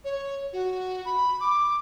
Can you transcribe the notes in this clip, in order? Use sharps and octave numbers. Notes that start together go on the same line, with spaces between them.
C#5
F#4
B5
D6